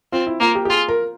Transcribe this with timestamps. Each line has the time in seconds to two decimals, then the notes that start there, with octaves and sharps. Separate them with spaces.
0.12 C4 F4
0.27 E4
0.40 A#3 F4
0.55 G4
0.65 G4
0.69 F4 G#4
0.89 A#4